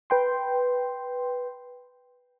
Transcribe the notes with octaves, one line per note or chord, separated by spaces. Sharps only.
B4 G5 C6